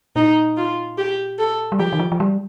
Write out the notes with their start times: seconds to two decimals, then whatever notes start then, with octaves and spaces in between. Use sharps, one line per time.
0.16 A#2 D#4
0.57 F4
0.98 G4
1.39 A4
1.72 G3
1.79 F3 G4
1.92 D#3
1.99 F3
2.12 F3
2.20 G3